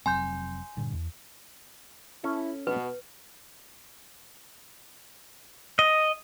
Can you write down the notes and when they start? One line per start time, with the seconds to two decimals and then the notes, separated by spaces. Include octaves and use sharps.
0.06 F1 F#3 C4 G#5 C6 G6
0.77 G2 A#2 D3
0.93 E2
2.24 C#4 E4 A4
2.67 B2 B4
5.79 D#5